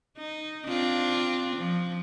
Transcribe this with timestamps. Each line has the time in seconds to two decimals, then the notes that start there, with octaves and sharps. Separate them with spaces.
0.18 D#4
0.67 C4 D4 F4
1.57 F3